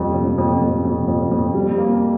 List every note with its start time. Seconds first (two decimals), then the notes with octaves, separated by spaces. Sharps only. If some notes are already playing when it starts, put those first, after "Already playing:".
Already playing: F2 G3
0.14 F2
0.38 F2
0.61 F2
0.85 F2
1.08 F2
1.31 F2
1.54 G3
1.78 A#3